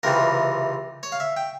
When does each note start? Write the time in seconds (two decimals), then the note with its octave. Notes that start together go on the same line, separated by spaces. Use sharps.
0.03 C#2 C3 E3 G3 A#4
1.03 C#5
1.12 F5
1.20 E5
1.37 G5